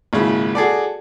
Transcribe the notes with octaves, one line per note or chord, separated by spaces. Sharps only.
G#1 A#2 C#3 E4
F#4 G#4 A4 D5